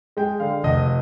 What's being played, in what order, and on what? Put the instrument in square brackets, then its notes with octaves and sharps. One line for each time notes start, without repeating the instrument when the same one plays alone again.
[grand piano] G#3 G5
D3 F5
F1 D#5